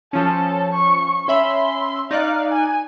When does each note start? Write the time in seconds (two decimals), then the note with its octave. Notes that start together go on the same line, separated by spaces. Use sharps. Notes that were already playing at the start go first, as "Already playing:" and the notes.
0.13 F3 C#4 A4
0.73 C#6
1.28 C#4 E5 B5 C6
2.11 D#4 D5 F5 F#6
2.53 G#5